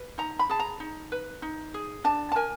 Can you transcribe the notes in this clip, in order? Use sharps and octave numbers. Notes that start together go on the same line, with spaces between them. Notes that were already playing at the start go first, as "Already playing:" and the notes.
Already playing: B4
D#4 A#5
B5
G#4 A5
A#5
D#4
B4
D#4
G#4
D4 A5
A5
A#4 G#5